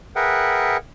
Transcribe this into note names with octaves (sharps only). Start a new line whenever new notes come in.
G#4 A#4 B4 E5 F#5 G5